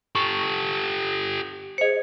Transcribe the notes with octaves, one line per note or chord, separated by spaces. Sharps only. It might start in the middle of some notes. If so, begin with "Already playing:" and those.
G4 A4 C#6
G#4 C5 D#5 C#7